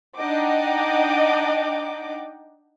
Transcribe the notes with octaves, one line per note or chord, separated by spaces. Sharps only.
D4 D#4 D#5 F#5 G5 D6